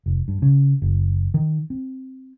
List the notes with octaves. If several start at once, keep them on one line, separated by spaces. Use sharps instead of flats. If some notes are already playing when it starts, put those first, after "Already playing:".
F1
G2
C#3
F#1
D#3
C4